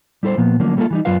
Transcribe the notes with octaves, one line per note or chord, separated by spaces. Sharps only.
G3 E4 A4 B4 C5
A#2 F3 A#3 B3
D3 F3 F#3 A3 A#3 C#4
G3 A3 A#3 C#4 F4 A4
E3 G3 D#4
F#2 F#3 F4 B4 F5